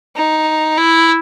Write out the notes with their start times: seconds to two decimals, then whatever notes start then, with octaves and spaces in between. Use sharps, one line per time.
0.16 D#4
0.77 E4